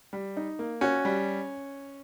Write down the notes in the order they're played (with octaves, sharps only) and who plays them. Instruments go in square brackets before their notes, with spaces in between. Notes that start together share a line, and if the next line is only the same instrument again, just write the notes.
[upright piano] G3
D#4
A#3
[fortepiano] C#4 [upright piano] F#4
[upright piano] G3